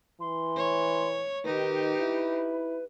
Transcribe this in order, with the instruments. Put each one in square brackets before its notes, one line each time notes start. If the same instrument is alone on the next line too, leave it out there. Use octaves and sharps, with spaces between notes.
[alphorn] E3 [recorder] C6
[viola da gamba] C#5
[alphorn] D#3 [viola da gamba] D#4 G4 [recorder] B4
[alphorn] E4